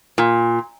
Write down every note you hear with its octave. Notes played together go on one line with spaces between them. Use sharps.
A#2